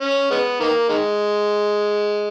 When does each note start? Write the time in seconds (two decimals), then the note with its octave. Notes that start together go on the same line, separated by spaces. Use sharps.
0.01 C#4
0.31 G#3 B3
0.60 D#3 A#3
0.89 D#3 G#3